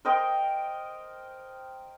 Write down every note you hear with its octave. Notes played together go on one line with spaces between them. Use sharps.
A#4 C5 D#5 G5